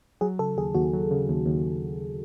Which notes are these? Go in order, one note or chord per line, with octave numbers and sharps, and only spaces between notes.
F#3 G#4
C#3 A4
D#2 G#4
D#2 F#4
F#3
C#3
D#2
D#2